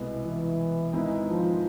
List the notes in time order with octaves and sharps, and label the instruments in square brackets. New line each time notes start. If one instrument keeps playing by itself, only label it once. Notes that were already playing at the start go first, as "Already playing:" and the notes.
Already playing: [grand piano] C2 B2 G#3 B3 E4
[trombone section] E3
[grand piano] G#1 G#2 G#3 B3 E4
[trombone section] F3